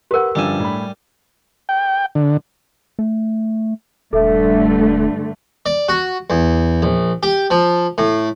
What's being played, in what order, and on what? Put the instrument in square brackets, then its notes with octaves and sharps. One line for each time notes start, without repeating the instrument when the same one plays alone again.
[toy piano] G4 A#4 [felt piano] B4 F#5
[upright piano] G1 F#2 F3 [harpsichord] G3 G#5 [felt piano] D4 E6 E7
[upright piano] A2 B5
[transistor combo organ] G5
D3
[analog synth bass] A3
[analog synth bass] D#1 [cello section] G2 D3 A3 [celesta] A4 E5
[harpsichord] D5
F#4
E2
A#1
G4
F3
A2